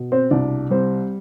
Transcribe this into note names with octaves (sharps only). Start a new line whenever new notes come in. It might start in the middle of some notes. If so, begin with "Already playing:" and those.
Already playing: B2
C4 C5
C2 D4 D5
G3 C4 C5